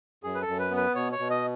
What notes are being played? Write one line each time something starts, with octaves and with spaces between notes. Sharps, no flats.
F#2 G#4
B4
A4
F#2
B4
B3
B4
B2 C#5
C#5
B2
D#5